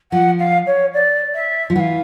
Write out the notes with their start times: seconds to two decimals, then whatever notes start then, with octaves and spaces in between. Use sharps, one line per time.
0.12 F3 F#5
0.39 F5
0.67 C#5
0.94 D5
1.35 E5
1.70 F3
1.76 E3 F#5
1.80 F5